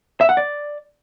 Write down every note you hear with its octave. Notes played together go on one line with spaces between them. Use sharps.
E5
F#5
D5